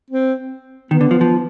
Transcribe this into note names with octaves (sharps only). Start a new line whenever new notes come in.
C4
D#3 B3
D3
F3
F3